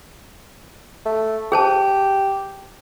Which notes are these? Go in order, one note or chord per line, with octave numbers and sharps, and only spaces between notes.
A3
G4 G#4 C5 A5